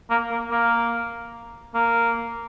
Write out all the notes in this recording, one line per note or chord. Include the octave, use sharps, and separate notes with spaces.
A#3
A#3
A#3
A#3